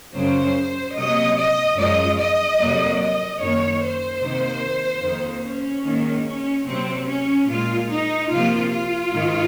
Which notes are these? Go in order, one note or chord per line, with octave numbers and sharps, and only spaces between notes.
F#2 C#3 F#3 C5
C3 F#3 A#3 D#5
D#5
F#2 F3 G#3 D#5
D#5
F2 C3 F#3 A#3
D#5
F#2 D#3 A#3 C#5
C5
C3 D#3 A#3
F2 D#3 A#3
C#4
G#2 D#3 A#3
C#4
C3 F#3 A#3 C4
C#4
A#2 G#3 F4
D#4
C3 F3 A#3 F4
F4
G#2 D#3